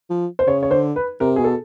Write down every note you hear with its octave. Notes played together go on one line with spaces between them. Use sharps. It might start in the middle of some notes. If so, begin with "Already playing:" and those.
F3
C5
C#3 C#5
C#5
D3 C5
B4
C3 A#4
B2 G#4
A4